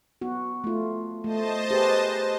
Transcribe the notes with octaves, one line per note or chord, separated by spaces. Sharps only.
B3 F#4
A3 F4
A3 C5 D#5 A5
G4 G#4 B4